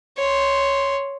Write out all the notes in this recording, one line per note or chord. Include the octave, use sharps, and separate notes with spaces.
C#5 C6